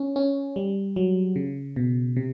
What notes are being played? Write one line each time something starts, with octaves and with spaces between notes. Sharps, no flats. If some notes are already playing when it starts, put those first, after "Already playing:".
Already playing: C#4
C#4
G3
F#3
C#3
B2
C3